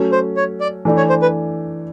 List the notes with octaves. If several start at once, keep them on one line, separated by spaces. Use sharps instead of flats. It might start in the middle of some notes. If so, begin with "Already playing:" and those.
Already playing: F#3 A3 C#4
C5
C#5
D5
E3 A3 D4
C#5
C5
B4